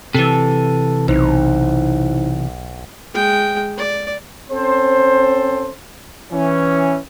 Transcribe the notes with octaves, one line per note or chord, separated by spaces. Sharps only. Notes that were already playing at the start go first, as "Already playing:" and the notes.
C3 E3 A4
B1 D#4 E4 C5
G#3 G5
D5
C4 C#4 A4 C5
E3 C#4